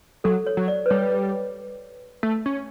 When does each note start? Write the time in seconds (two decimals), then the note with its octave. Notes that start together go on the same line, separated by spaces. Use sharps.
0.24 F#3 A4
0.46 C#5
0.57 F#3
0.68 D5
0.86 B4
0.90 G3 C#5
2.23 A3
2.46 C#4